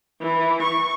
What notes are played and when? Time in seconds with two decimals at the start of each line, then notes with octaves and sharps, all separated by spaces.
0.21 E3
0.63 C#6